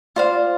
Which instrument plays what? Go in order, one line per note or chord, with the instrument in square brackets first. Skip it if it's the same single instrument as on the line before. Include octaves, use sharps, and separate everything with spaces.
[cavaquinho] F4 C5 F5 [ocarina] D5